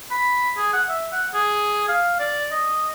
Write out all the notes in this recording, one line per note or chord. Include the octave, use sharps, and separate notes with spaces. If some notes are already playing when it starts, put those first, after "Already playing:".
B5
G#4
F#5
E5
F#5
G#4
F5
D5
D#5